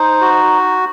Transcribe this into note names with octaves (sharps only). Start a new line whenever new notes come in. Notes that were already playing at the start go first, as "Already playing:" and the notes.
Already playing: D#4 C5
F#4